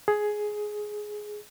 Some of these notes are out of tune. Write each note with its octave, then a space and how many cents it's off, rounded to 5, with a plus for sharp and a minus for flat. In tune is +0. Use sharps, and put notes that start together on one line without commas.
G#4 +10